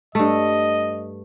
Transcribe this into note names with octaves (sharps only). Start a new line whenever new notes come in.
G2 A3 D#5